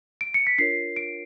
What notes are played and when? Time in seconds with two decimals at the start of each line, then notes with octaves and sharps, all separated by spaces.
0.21 D7
0.34 C#7
0.47 B6
0.58 D4 F4 A#4 C#5 C7
0.96 D7